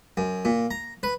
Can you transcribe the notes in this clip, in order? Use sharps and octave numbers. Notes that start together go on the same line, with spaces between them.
F#2
A#2
A#5
B4